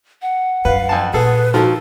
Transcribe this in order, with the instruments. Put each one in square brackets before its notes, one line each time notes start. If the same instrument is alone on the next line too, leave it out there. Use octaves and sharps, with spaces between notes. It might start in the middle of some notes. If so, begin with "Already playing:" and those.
[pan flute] F#5
[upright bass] F#2 [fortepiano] B4 [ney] F5
[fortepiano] F2 G#5 A5
[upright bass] A#2 [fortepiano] G#4 A4 [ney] B4
[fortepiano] D#3 F3 [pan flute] F#4 [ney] A4